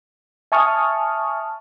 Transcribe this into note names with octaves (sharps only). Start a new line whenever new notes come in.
E5 G#5 A5 C#6 D#6 F6